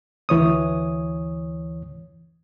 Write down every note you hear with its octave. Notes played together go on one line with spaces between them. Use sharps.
D2 E3 C#5 D#6